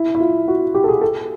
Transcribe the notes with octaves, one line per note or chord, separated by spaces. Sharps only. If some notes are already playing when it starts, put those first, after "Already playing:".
Already playing: E4
E4
F4
F#4
G4
A4
G#4
A4